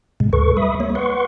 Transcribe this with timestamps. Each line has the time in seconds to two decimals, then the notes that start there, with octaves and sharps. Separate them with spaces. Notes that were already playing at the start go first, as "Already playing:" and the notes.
0.20 A2 C3 G#3
0.33 D2 A4 B4 C#6
0.57 G3 E5 B5 D#6
0.80 A#3 C#5
0.95 B4 F#5 C6 C#6